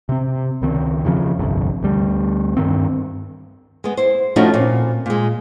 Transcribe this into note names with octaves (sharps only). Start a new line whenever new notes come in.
C3 C4
C#2 D#3 C4
E2 C#3 F3
G1 C2 F2
D2 G3
G2 D#3 C4
G#3 B3
E4 C5
F3 A3 C#4 D#4 E4 F#4
A#2 C4
A#2 G#3